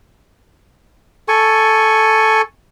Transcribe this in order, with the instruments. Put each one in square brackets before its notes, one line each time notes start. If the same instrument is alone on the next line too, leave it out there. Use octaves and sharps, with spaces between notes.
[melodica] A4 G#5 C#6